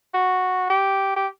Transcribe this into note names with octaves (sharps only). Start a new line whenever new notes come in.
F#4
G4
G4